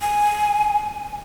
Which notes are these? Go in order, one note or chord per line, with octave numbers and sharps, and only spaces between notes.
G#5